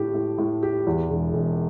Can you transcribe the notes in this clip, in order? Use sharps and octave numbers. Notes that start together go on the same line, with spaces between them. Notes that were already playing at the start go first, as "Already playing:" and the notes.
Already playing: A2 A3 G4
A2
A2
G4
E2
E1
E1